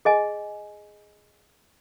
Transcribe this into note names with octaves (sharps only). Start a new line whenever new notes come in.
G#4 D#5 G#5